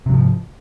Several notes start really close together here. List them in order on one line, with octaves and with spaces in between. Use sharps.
C3 F#3 G#2 F3